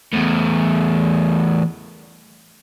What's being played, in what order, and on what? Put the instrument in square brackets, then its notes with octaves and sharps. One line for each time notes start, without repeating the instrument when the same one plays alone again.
[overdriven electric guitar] E2 A2